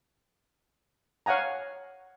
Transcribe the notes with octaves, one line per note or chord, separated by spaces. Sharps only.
C#5 F5 F#5 G#5 A#5